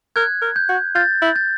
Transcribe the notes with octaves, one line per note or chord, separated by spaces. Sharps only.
A#4 F#6 G#6
A#4
G6
F#4
F4 G6 A6
E4
G6 A6